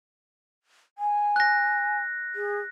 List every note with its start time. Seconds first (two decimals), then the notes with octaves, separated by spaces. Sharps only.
0.98 G#5
1.36 F#6 A#6
2.35 G#4